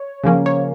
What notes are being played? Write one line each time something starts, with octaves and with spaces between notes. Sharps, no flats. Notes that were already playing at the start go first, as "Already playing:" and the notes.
Already playing: C#5
C#3 F3 A#3 C#4
C#5